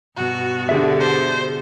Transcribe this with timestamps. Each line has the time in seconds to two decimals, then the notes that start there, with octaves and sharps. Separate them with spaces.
0.17 G2 B2 F#4
0.69 D3 G4 G#4 E5
1.00 C5